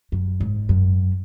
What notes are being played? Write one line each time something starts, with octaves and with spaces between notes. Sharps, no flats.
F#2
G#2
F#2